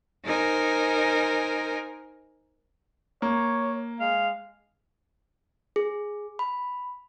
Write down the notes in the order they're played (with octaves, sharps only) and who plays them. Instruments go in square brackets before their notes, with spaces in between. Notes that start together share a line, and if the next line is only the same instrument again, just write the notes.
[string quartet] D#4 A#4 C5 G#5
[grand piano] A#3 [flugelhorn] C#5
[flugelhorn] G#3 [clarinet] F5
[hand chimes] G#4
B5